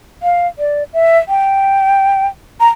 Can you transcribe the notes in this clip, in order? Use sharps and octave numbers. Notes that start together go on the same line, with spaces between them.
F5
D5
E5
G5
A#5